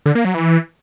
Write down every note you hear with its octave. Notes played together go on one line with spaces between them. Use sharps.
D3
A#3
F#3
E3